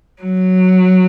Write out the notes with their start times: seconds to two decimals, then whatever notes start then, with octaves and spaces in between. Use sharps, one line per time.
0.22 F#3